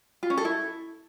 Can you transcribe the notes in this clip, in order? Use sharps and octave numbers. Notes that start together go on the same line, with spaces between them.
F4
C#4
A4
E4